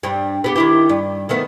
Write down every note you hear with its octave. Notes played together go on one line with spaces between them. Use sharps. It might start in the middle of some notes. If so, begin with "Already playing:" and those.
G2 G3
B3 G4
D#3 E4 G4
G2
D#3 A3 B3